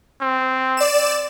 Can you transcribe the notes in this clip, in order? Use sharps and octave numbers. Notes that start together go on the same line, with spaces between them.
C4
D5 E7